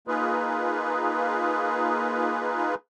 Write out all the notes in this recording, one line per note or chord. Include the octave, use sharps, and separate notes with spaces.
A#3 D#4 F4 G#4 B4